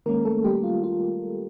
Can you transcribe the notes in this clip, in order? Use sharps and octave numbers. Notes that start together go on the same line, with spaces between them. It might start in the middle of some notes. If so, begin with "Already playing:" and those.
D#3 G#3 A#3 C#4 A#4
A3 A4
G3 G4
F4
F4